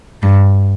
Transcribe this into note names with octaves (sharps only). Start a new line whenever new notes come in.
G2